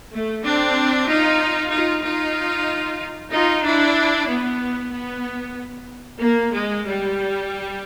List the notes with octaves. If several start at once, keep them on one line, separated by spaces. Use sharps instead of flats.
A3
C4 D4
D#4 F4
D#4 F4
D#4 F4
D#4 F4
D4 E4
B3
B3
A#3
G#3
G3